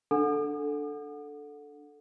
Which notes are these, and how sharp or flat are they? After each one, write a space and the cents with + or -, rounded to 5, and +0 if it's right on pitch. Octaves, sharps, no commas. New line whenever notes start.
D4 +0 A4 +0 F#5 -20